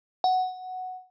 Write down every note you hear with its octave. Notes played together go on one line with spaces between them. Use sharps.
F#5